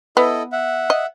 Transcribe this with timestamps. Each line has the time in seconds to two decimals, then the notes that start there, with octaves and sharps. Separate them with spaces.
0.17 B3 E4 A4 D#5
0.52 E5 F#5
0.90 D#5